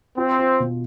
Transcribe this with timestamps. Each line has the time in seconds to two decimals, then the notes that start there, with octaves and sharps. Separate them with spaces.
0.17 C4 F4
0.39 F4
0.60 B2